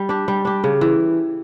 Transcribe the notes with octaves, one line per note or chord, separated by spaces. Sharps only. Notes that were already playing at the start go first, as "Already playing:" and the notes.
Already playing: G3
D4 G4
G3
D4 G4
C#3
E3